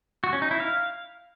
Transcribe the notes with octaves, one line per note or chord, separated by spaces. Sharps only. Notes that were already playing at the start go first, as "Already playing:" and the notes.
F#4
C#4
D#4
E4
F5